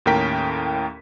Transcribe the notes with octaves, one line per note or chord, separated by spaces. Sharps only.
D#2 A2 C#4 A#4 G5 B6